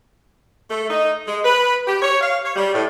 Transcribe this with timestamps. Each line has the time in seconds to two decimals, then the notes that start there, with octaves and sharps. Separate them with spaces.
0.69 A3
0.90 D#4
1.27 G#3
1.45 B4
1.86 G4
2.02 C#5
2.21 F5
2.44 C#5
2.56 G3
2.74 A2